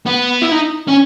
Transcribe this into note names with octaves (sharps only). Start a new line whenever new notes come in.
B3
E4
D#4
C#4